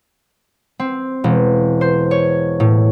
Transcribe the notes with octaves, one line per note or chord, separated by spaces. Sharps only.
C4
E1
C5
C#5
A2